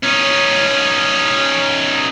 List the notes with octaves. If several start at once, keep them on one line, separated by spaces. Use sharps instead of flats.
C#4 D#4